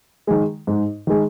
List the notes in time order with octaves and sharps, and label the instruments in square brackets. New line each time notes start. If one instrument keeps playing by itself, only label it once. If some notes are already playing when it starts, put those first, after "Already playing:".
[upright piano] D#3 G#3
G#2
D#3 G#3